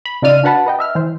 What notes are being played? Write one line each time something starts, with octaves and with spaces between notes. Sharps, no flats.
B5
C#3 D#4 F4 D5 F6 D#7
D4 F#4 B4 F#5 A5 B5
B4 D#5 G5
D#5 E5 F6
E3 C5